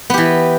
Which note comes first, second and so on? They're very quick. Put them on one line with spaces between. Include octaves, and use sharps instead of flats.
B3 G4 E3